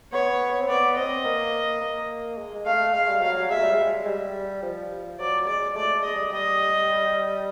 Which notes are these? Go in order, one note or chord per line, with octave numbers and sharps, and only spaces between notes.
B3 C#5
C4
B3 D5
C4 D#5
A#3
A#3
G#3
G#3
A3 F5
G#3 F5
G3
F#3 F5
F#3
G#3 E5
G3
G#3
G3
F3
F#3 D5
G#3 D5
A3 D5
G#3
D#5
G3
G3 D#5